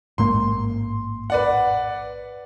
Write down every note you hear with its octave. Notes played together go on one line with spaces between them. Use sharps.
A1 G#2 A#3 C6
B4 D5 F#5